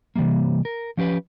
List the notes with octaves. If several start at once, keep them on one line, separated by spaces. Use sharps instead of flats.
C3 E3 G3 A3 A#3
A#4
F3 C#4 G4 B4